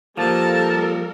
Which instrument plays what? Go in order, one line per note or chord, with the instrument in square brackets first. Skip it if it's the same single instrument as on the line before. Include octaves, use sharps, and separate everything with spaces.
[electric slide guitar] F3 A#3 [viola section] G3 A4 A#4 [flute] A5